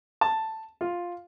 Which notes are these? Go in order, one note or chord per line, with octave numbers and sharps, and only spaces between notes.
A5
F4